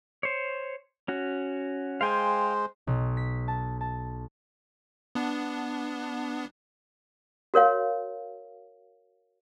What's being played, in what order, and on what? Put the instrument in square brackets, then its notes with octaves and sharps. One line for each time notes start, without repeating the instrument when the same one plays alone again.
[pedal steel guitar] C5 C#5
C#4 F#4
[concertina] G#3 C5 [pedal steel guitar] F5 G5 G#5
[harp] B1
B6
A5
A5
[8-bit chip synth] B3 D4
[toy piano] F#4 A#4 C#5 F5